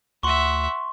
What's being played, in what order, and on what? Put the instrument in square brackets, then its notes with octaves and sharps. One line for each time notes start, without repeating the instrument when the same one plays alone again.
[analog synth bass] D2 [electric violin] E5 F#5 [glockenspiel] C6 C#6